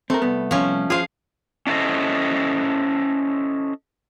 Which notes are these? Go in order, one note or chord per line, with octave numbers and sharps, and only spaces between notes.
A3 C4 A#4
C2 B3
F3 C#4
F4 G#4 C5 F5
C#4 D4 E4 A4 C5 D#5